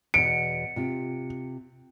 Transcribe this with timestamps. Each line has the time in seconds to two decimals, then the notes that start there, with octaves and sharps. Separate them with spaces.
0.14 E2 B2 C#7 D7
0.76 C3 F4